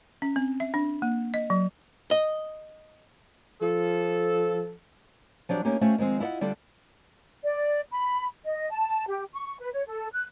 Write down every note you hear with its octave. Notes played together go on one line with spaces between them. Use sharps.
C#4
C4
E5
D4
A#3
D#5
F#3
D#5
F3 A4
F3 F#3 D4 G4
A3 A#3 C#4 D#4 G4
A3 C#4 F#4 C5 F5 G5
D#3 F3 G#3 C4
E4 F4 C#5 D#5 F#5
D3 G3 D4 F4 A4
D5
B5
D#5
A5
G4
C#6
B4
C#5
A4
F#6